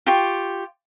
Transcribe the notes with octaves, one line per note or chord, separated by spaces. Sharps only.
F4 G4 C#6